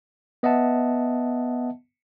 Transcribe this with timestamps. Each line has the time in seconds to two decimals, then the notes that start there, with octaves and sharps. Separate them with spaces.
0.43 B3 D#5 E5 F#5 A5